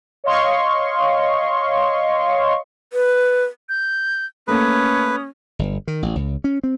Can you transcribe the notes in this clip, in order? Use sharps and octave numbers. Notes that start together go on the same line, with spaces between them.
C#5 D#5 F5 C6 C#6
B4
G6
A3 A#3 C#4 A4 B4 D#6
G1
D#3
A1
C#2
C#4
C4